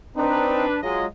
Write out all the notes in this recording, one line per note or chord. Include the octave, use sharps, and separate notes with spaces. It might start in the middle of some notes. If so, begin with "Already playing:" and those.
C4 D4 D#4 B4
F#3 G#3 F4 D#5